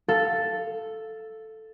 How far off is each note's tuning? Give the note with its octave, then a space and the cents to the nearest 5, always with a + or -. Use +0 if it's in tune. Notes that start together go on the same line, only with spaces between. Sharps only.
A4 +0 F5 -10